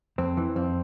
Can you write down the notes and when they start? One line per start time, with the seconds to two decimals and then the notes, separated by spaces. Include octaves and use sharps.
0.18 F2 C4
0.37 E3
0.56 F2 C4